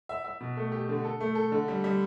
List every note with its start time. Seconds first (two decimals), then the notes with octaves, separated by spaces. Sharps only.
0.09 E5
0.25 E5
0.41 B2
0.57 A3
0.72 G4
0.89 D3
1.05 A4
1.20 A3
1.35 A4
1.52 D3
1.68 G3
1.84 G3